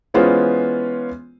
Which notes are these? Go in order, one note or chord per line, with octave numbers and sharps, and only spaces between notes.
E3 G#3 B3 C#4 F4 C5